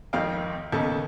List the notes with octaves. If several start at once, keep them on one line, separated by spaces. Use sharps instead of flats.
G#1 F2 D#3 D#5 F5 G5
D#2 C#3 B3 A4 D#5